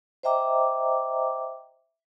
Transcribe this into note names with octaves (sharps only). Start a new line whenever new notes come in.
C5 D#5 E5 G5 A#5 D6